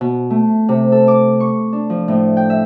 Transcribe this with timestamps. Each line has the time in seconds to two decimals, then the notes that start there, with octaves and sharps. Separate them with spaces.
0.01 B2
0.30 A3
0.69 C3
0.92 A4
1.08 D6
1.40 C#6
1.73 D4
1.90 F3
2.08 A2
2.37 G5
2.50 E5